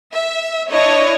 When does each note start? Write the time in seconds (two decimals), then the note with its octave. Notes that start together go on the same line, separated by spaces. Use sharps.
0.12 E5
0.70 D4 E4 C#5 D#5